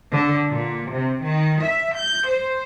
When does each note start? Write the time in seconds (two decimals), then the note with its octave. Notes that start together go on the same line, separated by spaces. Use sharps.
0.12 D3
0.50 A#2
0.91 C3
1.23 D#3
1.64 E5
1.98 G6
2.29 C5